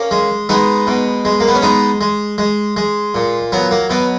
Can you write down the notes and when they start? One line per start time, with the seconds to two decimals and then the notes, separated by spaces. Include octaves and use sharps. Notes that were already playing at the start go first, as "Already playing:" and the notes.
Already playing: A#3 C#4
0.11 G#3
0.49 G#3 B3 D#4
0.87 B2
1.25 G#3
1.40 A#3
1.48 B3
1.55 C#4
1.62 G#3 B3 D#4
2.01 G#3
2.38 G#3
2.76 G#3
3.14 A#2
3.52 F#3 B3
3.71 A#3
3.90 B2 B3